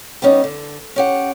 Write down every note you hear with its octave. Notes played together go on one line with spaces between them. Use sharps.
G3 B3 C#4 D#4
D3
C#4 G4 F#5